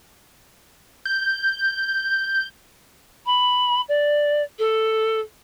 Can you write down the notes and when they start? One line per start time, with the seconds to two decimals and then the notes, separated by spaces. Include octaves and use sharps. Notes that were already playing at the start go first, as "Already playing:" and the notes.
1.05 G6
3.26 B5
3.88 D5
4.59 A4